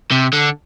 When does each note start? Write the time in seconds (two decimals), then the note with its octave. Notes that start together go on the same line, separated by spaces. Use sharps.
0.12 C3
0.33 D3